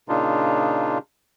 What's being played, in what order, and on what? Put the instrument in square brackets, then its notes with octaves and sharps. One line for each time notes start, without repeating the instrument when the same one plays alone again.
[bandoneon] A#2 C#3 D4 D#4 F4